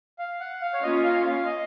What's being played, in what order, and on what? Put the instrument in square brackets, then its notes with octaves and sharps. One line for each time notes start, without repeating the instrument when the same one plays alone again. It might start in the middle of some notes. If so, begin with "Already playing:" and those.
[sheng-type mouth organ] F5
F#5
F5
C#5
[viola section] A#3 C#4 F4 [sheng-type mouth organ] D#5
[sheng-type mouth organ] F5
F5
D#5